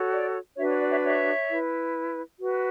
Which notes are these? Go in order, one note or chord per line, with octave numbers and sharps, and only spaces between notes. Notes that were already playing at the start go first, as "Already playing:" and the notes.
Already playing: F#4 A4 C#5
D5
D4 F#4 B4 C#5 E5
C#5
D5
C#5 E5
C#5 E5
E4 B4
F#4 B4